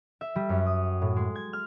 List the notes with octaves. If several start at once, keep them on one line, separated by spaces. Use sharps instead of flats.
E5
G3
F#2
D#6
A2
G#3
G#6
F6